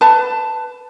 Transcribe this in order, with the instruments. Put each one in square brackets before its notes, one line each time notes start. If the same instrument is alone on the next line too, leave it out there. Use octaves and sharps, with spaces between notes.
[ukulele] B4 A5